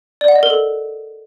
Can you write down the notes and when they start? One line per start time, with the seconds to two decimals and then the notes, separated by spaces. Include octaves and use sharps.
0.21 D5
0.28 F#5
0.36 D#5
0.43 A#4
0.50 A4